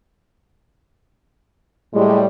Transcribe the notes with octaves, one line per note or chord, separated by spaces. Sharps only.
A2 G3 G#3